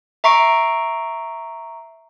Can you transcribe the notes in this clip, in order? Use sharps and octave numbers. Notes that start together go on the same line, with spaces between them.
E5 A#5 C#6 C7 D7